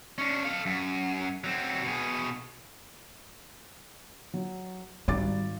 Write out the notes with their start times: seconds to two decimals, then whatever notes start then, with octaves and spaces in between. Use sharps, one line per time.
0.18 C#4 D4
0.45 A4 F5
0.66 F#2
1.44 F#3 C4
1.83 B2 G#4
4.34 F#3
5.08 G#1 G3 D6 A6